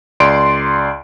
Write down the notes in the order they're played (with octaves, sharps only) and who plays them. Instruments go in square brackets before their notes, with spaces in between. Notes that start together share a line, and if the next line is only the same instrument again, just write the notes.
[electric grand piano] C#2 D5 C6 D7